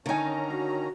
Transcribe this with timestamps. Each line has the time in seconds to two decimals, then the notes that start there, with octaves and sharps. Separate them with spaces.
0.06 D3 D#3 C#4 D#4 C#5 G#5 A#5
0.50 F#4 F5